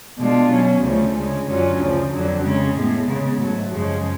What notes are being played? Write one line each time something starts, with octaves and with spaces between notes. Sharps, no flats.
B2 G#3 D4 F4
B2 F#3 C#4
D2 C#3 F3 A3 C#4
D2 C#3 G#3 C#4
F#2 D3 F#3 C#4 F4
D2 C#3 F3
F2 D3 F#3
C#3 G#3 C#4
A2 G#3 B3
C#3 G#3 B3
G#2 F#3 A3
F#2 C#3 F3 G#3